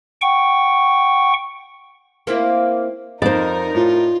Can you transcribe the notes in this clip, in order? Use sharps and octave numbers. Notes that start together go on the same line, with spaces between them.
F#5 G5 C#6
A#3 C4 E4
F2 D#4 A#4 C5 D5
A2 F4